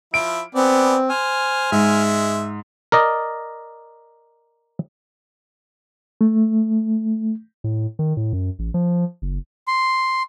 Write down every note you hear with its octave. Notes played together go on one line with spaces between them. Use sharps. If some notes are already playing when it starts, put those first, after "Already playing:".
F3 E4 E5 D7
B3 C4 G#4 D5
C5 G#5 F6
G#2 G#3 E5
A#4 D5 D#5
A3
A2
D#3
A2
F#2
A1
F3
F#1
C6